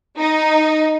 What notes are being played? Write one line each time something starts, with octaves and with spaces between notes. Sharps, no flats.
D#4